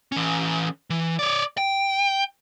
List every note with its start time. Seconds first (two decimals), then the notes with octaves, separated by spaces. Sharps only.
0.12 E3 C#4
0.90 E3
1.19 C#5 D5
1.58 G5